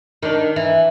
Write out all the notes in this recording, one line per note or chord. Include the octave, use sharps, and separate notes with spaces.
D#3 D4
E3